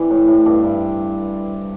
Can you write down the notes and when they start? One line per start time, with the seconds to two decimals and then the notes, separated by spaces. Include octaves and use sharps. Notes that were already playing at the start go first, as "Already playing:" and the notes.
Already playing: E3 C4 D4 E4
0.10 A2
0.28 A2
0.46 G2 D4
0.63 G2 E4